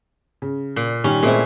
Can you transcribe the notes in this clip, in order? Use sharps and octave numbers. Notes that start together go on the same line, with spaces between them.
C#3
A#2
D#3 G3 C#4
A#2 G#3 A3 C4 E4